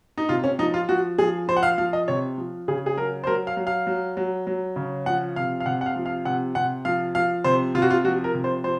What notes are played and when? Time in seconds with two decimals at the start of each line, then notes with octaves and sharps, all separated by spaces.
0.18 D#4
0.29 C3 F4
0.44 C#4
0.59 F3 D#4
0.74 F4
0.89 F3 F#4
1.18 F3 G#4
1.48 F3 C5
1.57 F#5
1.63 F5
1.78 F3 F5
1.93 D#5
2.08 C3 C#5
2.38 F3
2.68 C#3 G#4
2.86 G#4
2.97 F#3 A#4
3.24 C5
3.27 F#3 A#4
3.47 F5
3.57 F#3
3.67 F5
3.87 F#3
4.17 F#3
4.47 F#3
4.76 C#3
5.06 F3 F#5
5.36 C3 F5
5.60 F5
5.66 C3 F#5
5.81 F#5
5.86 F5
5.96 F3
6.06 F5
6.25 C3 F#5
6.55 C3 F#5
6.85 F3 F5
7.15 F3 F5
7.44 C3 C5
7.75 C3 F4
7.82 F#4
7.90 F4
8.05 F3 F#4
8.24 A#4
8.34 C3
8.44 C5
8.64 F3 C5